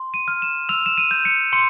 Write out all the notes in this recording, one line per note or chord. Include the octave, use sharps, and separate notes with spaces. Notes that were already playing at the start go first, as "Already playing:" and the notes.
Already playing: C6
D#7
F6
E7
E6 F7
E7
D#7
G6
C#7
C6 C#7